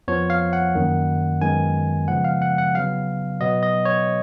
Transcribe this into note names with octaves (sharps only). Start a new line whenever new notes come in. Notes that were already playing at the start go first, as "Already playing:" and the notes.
F2 F3 B3 C#5
F5
F#5
F#2 D#3 A#3
F#2 D#3 G#3 B3 G#5
C#3 F3 G#3 B3 F#5
F5
F#5
F#5
C#3 F#3 B3 F5
B2 F#3 B3 D#5
D#5
C#5